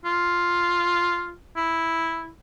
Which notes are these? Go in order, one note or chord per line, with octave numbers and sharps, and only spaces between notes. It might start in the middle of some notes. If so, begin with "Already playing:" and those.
F4
E4